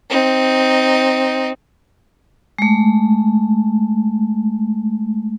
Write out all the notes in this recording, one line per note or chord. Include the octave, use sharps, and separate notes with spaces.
C4 D#4
G#3 A3